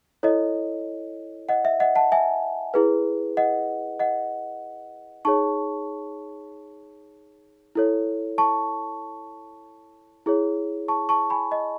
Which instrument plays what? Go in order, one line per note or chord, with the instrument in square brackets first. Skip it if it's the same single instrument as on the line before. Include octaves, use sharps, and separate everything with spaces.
[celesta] E4 A4 C#5 D#5
D#5 F#5
E5
D#5 F#5
F#5 A5
E5 G#5
E4 G#4 B4
D#5 F#5
D#5 F#5
D#4 G#4 C#5 A5 C#6
E4 A4 C#5
A5 C#6
E4 G#4 C#5
A5 C#6
A5 C#6
G#5 B5
D#5